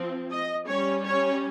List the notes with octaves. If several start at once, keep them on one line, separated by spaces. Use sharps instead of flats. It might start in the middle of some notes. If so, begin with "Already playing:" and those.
Already playing: F3 C4
D#5
G3 C#4 C#5
C#5